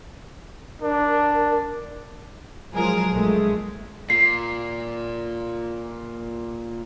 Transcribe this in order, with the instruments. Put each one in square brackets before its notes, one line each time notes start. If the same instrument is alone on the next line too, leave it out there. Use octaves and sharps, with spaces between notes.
[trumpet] D4 [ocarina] A#4
[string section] F3 F#3 G#3 G#4 A#4
A#1 G#3 A3
[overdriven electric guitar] A#2 [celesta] C7